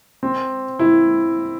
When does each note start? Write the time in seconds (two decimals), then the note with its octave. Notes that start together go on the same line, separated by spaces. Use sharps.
0.23 C4
0.79 E4